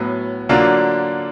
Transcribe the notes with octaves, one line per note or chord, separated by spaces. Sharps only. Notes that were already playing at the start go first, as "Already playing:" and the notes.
Already playing: A2 F#3 B3
D3 F#3 A#3 D4 F4